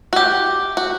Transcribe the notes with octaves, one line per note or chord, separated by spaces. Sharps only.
F#4
G4
F#4